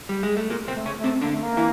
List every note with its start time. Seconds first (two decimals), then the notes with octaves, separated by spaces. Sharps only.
0.09 G3
0.23 G#3
0.37 A3
0.50 A#2 A#3
0.68 C3 C4
0.74 A3
0.86 C#3 C#4
0.98 A3
1.04 C3 C4
1.21 D3 A#3 D4
1.32 A3
1.42 A#3
1.57 E3 E4